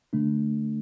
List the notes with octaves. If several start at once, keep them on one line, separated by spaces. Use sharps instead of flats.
D3 A3 D4